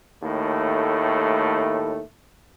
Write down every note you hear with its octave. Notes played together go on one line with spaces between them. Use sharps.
D#2 A2 A3